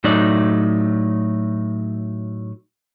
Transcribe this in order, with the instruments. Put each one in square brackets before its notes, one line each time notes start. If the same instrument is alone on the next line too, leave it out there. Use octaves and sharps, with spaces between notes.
[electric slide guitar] A2 F#3 A3 D#4 D5